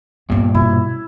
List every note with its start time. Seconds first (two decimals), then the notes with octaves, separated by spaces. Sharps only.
0.30 G2 A#2 B3 D4
0.54 B2 E4